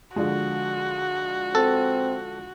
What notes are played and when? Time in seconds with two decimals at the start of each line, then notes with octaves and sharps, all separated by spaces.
0.16 D3 F3 G#3 F#4
1.55 C4 A4